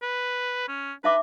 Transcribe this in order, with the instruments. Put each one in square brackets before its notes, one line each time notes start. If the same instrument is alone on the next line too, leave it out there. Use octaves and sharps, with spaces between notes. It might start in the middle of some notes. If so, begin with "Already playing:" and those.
[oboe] B4
C#4
[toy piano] D#4 E5 D6 [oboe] B4